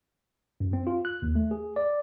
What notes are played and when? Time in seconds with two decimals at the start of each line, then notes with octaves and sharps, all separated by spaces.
0.60 F#2
0.73 C4
0.87 F4
1.05 F#6
1.22 D#2
1.35 A3
1.51 G#4
1.76 D5